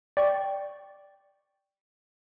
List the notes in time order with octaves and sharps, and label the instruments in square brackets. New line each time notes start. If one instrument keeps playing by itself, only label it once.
[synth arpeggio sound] D5 G5 C#6